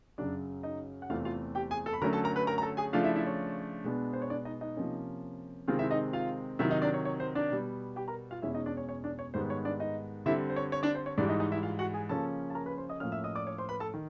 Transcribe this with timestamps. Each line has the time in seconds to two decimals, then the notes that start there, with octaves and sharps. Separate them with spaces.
0.18 F#2 C#3 F#3 D4 D5
0.63 D#4 D#5
1.02 F#5
1.10 E2 C3 E3 A3 C4 F4 F5
1.25 F4 F5
1.55 G4 G5
1.71 G#4 G#5
1.86 A4 A5
1.93 B5
2.01 D3 F#3 A3 C#4 A#4 A#5
2.13 A4 A5
2.24 A#4 A#5
2.36 B4 B5
2.47 A#4 A#5
2.58 A#5
2.62 A4 A5
2.77 G#4 G#5
2.93 C#3 F3 A3 D4 F4 F5
3.04 E4 E5
3.15 E4 E5
3.27 C#5
3.84 B2 G#3 B3 D4
4.13 C5
4.22 C#5
4.30 D4 D5
4.45 D#4 D#5
4.61 D#4 D#5
4.76 C3 F3 A#3 C#4
5.68 C3 D#3 G#3 C4 F4 F5
5.79 E4 E5
5.91 D#4 D#5
6.13 F4 F5
6.59 C3 D#3 F#3 E4 E5
6.70 D#4 D#5
6.82 D4 D5
6.94 C#5
7.05 C#5
7.20 C5
7.35 D4 D5
7.51 B2 G3 B3
7.96 G4 G5
8.08 A#4 A#5
8.31 F4 F5
8.42 E2 B2 G#3 C#4 E4 E5
8.54 D#4 D#5
8.66 D4 D5
8.77 C#5
8.89 C#5
9.04 D4 D5
9.19 C#5
9.34 G#2 D#3 G3 B3 C5
9.50 C#5
9.65 D4 D5
9.80 D#4 D#5
10.26 D3 G3 C4 E4 E5
10.50 C5
10.56 C#5
10.72 C#5
10.83 D4 D5
10.95 C5
11.06 C#5
11.18 G#2 E3 G3 D4 D5
11.29 D#4 D#5
11.40 D#4 D#5
11.52 E4 E5
11.63 F4 F5
11.79 F#4 F#5
11.94 G#4 G#5
12.09 C#3 F3 A#3 C#4 A4 A5
12.50 A5
12.55 A#4 A#5
12.66 B4 B5
12.78 C5 C6
12.89 D#5 D#6
13.00 A2 F3 A#3 C#4 F5 F6
13.12 E5 E6
13.24 D#5 D#6
13.35 D5 D6
13.47 C#5 C#6
13.58 C5 C6
13.69 B4 B5
13.80 A4 A5
13.94 D#3